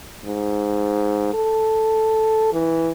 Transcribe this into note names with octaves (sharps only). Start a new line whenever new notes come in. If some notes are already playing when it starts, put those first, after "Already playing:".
G#2
A4
E3